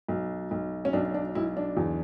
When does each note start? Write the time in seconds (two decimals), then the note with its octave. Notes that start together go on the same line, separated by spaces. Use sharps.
0.08 B1
0.51 B1
0.85 C#4
0.93 B1 D4
1.14 D4
1.35 B1 E4
1.57 D4
1.77 E2